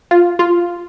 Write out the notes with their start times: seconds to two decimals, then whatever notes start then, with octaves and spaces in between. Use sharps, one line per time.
0.11 F4
0.39 F4